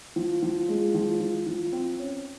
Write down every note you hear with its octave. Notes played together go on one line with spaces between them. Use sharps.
F3
F3
G#3
F3
F3
F3
C4
C#4